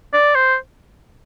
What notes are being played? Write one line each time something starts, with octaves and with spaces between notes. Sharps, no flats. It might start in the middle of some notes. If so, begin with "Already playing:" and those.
D5
C5